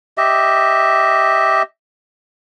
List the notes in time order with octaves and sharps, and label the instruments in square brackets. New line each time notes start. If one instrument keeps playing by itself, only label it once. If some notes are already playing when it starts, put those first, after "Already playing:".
[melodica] G4 D#5 E5